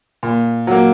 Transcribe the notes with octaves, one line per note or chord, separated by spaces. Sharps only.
A#2
F#3 A#3